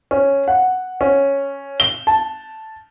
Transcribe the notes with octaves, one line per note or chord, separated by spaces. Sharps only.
C#4
F#5
C#4
G7
A5